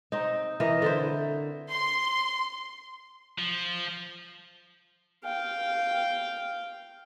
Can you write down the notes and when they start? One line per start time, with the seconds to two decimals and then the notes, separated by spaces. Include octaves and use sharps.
0.12 C4 D#4
0.60 E3 A#4 D#5
0.82 D3 E4 C5
1.71 C6
3.39 F3
5.24 F5 G5